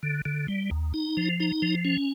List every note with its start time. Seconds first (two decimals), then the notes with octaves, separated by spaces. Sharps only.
0.03 D3
0.25 D3
0.48 G3
0.71 D#2
0.94 D#4
1.17 F3
1.40 D#4
1.62 F3
1.85 C#4